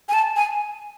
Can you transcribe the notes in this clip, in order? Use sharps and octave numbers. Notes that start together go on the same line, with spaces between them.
G#5
A5
G#5